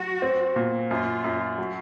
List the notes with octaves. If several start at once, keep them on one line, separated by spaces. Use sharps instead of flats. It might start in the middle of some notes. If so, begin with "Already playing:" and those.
Already playing: F#3 F#4
C4
A#2
F#2 F4
F#2
F#3